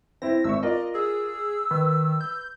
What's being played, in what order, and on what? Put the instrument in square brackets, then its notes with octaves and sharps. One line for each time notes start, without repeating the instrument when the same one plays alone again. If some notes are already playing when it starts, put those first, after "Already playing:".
[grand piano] C4 E4 [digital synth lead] A#6
[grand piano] G#1 E5 C#6 [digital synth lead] E6
[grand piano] F4 A#4 D5 [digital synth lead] D#5
[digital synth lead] G#4 [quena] E6
[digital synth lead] D#3 [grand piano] B4
[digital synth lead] G6